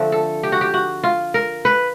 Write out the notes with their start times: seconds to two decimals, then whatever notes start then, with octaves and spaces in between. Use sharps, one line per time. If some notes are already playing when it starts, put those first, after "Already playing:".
Already playing: D3 F3 A3 C4
0.12 A4
0.43 G4
0.52 F#4
0.61 G4
0.74 F#4
1.04 F4
1.34 A#4
1.65 B4